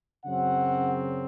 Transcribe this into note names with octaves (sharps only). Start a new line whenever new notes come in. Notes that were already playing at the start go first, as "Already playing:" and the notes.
F#2 C#3 F#3 C4 F#5